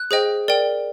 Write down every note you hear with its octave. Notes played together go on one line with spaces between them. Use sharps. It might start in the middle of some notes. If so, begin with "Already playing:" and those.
Already playing: F#6
G#4 C5 D#5 G5
A#4 D5 G5